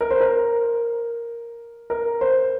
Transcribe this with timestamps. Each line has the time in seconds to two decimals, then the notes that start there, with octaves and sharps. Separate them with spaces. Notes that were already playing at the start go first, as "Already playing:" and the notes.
0.01 A#4
0.11 C5
0.20 A#4
1.90 A#4
2.21 C5